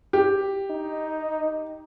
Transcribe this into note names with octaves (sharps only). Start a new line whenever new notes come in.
G4
D#4